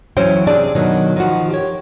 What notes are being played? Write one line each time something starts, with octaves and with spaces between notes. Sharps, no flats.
E3 F#3 C#4 C5 C#5 G5
C3 C4 D4 G#4 D5 A5
B2 D#3 F#3
D#3 F3 F#4
G4 C#5